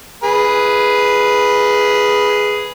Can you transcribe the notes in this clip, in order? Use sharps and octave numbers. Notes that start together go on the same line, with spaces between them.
G#4 B4